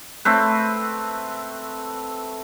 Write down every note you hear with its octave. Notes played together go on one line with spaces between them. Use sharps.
A3 C4 B4